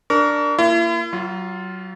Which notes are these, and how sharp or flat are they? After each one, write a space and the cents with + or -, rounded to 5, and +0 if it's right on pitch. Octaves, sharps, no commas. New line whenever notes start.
D4 +5 A#4 +0 C#6 +45
A#3 -5 E4 +45
F#3 +25 F4 +0